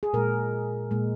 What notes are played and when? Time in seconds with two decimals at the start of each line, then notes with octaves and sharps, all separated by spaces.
0.03 G#4
0.13 A#2 G#3 A#4
0.91 A#2 G#3